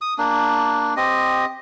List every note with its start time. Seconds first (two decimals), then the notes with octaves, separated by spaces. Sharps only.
0.01 D#6
0.18 A#3 D4
0.97 C4 G4 D#5